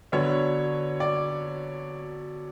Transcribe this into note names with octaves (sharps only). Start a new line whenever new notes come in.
D3 F#3 B3 D4 C#5
D5